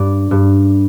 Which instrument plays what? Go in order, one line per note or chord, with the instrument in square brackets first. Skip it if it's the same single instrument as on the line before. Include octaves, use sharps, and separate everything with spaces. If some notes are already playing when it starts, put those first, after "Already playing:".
Already playing: [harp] G2 D5
G2